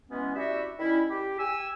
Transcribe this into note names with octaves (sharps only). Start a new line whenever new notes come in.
B2 E3 G#3 B3 C#4
D4 E4 F#4 G4 E5
D#3 G3 C#4 E4
G4
G4 G#5 E6